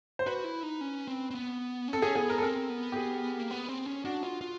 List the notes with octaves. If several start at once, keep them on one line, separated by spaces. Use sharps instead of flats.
C5
F#4 B4
E4
D#4
C#4
C4
C4
B3
C#4
C4 A4
C#4 G#4
B3 G#4
A#4
A4
C4 A#4
B3
G4
G#4
A#3
B3
C4
C#4
D4 F#4
F4
F4